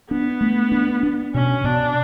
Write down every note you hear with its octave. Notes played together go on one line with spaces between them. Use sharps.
B3 D4
A3
D4
D4
B2 C#4
B2 D4